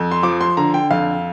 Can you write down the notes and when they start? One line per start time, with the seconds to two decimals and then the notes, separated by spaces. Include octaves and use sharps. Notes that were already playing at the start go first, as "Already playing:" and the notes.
Already playing: F2
0.12 C6
0.23 F3 D6
0.41 C6
0.57 D3 A#5
0.74 G5
0.91 F2 F5